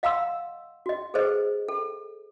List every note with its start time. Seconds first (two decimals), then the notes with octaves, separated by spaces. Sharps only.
0.03 D#5 F5 F#5 A#5 C6 E6
0.86 F#4 D#5
1.14 G#4 A4 B4 C5 D#5
1.69 A4